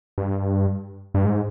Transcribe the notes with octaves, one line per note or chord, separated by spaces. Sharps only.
G2
G2
G#2